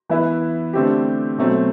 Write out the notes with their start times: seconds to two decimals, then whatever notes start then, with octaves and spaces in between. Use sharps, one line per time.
0.09 E3 B3 E4 B4
0.73 D3 A3 C4 G4
1.38 B2 F#3 A3 C4